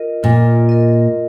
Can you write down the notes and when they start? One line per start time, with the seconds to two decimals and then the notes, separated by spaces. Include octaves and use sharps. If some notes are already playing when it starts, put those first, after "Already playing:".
Already playing: F4 A#4 D#5
0.23 A#2 F4
0.69 A#4 D#5